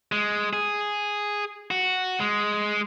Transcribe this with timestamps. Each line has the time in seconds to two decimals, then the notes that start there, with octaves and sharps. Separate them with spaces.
0.12 G#3
0.53 G#4
1.71 F#4
2.20 G#3